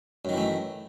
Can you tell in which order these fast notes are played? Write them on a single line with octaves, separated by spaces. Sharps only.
F#2 D#3 E3 A3